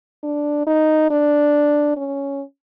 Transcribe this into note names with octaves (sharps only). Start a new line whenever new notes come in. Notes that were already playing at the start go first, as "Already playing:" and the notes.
D4
D#4
D4
C#4